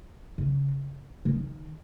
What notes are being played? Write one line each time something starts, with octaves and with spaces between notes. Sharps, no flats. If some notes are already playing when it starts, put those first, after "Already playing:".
C#3
C#3
D#3